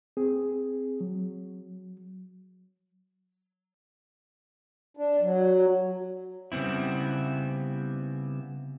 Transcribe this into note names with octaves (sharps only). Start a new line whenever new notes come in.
C4 G#4
F#3
D4
F#3
C#3 G3 B3 C4 E4